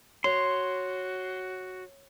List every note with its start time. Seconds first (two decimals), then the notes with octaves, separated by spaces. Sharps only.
0.24 F#4 C#5 C6